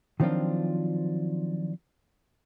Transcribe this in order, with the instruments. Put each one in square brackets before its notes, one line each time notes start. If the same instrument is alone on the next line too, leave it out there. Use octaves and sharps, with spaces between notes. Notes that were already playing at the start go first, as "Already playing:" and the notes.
[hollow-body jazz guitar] D#3 F3 F#3 C4 D4 F4